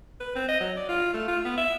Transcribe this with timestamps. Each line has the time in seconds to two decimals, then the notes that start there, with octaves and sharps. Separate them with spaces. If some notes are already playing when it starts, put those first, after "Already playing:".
0.20 B4
0.35 C4
0.49 D#5
0.60 F#3
0.77 D5
0.89 F4
1.14 A3
1.28 F4
1.45 B3
1.58 E5